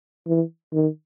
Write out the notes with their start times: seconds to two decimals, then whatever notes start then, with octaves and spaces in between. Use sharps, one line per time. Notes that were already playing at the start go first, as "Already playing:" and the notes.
0.28 E3
0.73 D#3